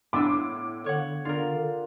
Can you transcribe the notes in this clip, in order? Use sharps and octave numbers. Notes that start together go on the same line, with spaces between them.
A2 B3 D4 C6 D6 E6
D3 C#5 F#5
D4 F4 A#4